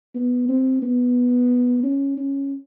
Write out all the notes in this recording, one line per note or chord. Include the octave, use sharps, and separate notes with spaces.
B3
C4
B3
C#4
C#4